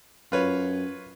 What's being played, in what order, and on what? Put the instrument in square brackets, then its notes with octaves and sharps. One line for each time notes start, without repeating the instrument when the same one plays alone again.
[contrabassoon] F#2 [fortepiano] F4 B4 C#5